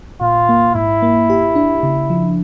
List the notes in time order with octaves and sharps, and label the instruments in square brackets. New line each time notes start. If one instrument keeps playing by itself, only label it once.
[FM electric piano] A#2 [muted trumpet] F4
[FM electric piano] A#3
[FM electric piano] G#2 [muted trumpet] E4
[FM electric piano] A#3
G4
D4
C#3
F3